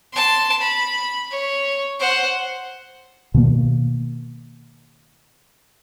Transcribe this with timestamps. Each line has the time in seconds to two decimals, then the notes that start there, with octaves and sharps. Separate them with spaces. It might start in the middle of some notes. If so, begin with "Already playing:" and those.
0.13 A5 C6
0.60 B5
1.31 C#5
1.99 C5 F#5
3.34 B2 D#3 A#3